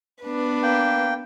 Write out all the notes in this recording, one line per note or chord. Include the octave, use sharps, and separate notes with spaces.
B3 D4 B4
A#3 G5